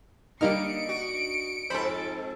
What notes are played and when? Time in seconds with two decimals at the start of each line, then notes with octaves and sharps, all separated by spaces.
0.41 D3 G3 A#3 D#4 F6 C#7 D7
0.89 F#4
1.70 F2 G#2 A4 C5 B5